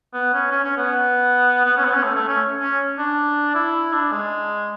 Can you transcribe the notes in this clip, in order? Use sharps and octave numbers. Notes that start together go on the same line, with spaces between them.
B3
C#4
C#4
C#4
B3
B3
C#4
B3
C#4
A3
A3
C#4
C#4
D4
E4
D4
G#3